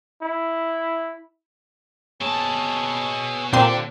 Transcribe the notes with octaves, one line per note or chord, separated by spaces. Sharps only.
E4
B2 G#4 C#5 A5 E6
A#2 D3 A#3 C4 D4 G4 C6